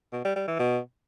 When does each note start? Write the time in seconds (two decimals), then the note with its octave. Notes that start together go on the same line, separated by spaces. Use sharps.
0.13 B2
0.24 G3
0.36 G3
0.48 E3
0.59 B2